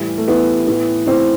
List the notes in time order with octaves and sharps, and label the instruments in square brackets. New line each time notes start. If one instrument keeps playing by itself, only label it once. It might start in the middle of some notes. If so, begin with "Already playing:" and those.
Already playing: [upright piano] A2 E3 G3
A3
A2 E3 B3
A2 E3
A2 E3 C4